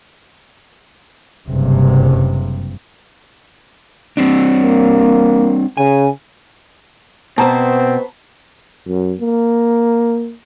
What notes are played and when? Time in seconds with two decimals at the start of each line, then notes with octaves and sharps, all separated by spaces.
1.47 F#1 G2 C3
4.17 G3 C4 D4
4.62 A#3
5.77 C#3 G#5
7.38 B2 B3 C4 C5 A5 A#5
8.88 F#2
9.21 A#3